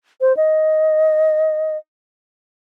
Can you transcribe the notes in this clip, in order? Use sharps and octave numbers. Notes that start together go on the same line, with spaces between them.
C5
D#5